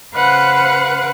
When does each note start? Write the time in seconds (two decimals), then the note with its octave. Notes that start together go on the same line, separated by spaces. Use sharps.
0.14 C#3 B4 C5 F5 F#5 F#6